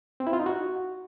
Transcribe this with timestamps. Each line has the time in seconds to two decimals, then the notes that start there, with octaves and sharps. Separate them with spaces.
0.20 C4
0.27 E4
0.33 F4
0.40 D#4
0.46 F#4